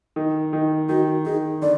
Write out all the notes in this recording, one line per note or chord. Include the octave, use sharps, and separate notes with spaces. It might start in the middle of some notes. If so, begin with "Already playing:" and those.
D#3
D#3
D#3 F#4
D#3 G#4
D3 D5